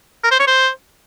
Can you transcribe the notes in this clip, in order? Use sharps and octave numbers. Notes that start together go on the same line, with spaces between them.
A#4
C5
C#5
C5